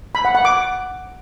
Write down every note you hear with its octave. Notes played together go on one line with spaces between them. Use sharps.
B5
F#5
F#5
D6